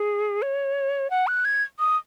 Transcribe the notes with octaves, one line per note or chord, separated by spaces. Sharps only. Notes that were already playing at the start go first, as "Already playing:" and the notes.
Already playing: G#4
C#5
F#5
F#6
G#6
D#6